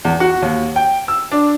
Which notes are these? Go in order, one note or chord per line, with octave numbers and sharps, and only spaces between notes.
E2
F#4
D#2
G5
E6
D4